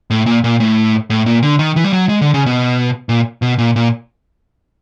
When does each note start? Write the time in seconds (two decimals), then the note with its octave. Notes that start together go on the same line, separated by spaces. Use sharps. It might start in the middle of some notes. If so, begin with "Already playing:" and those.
0.10 A2
0.26 A#2
0.44 A#2
0.60 A2
1.10 A2
1.26 A#2
1.43 D3
1.59 D#3
1.76 E3
1.84 G3
1.93 F#3
2.09 G#3
2.21 D3
2.34 C#3
2.46 B2
3.09 A#2
3.42 B2
3.58 A#2
3.76 A#2